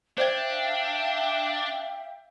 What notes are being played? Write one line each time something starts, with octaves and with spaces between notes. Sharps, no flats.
D4 C5 D5 E5 F5 G5 G#6